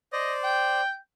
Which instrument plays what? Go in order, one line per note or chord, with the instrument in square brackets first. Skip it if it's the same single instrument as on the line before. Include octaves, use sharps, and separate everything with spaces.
[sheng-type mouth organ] C5 D5 [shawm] D#5
[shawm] G5